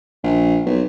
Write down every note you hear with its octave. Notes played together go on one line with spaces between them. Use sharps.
A#1
B1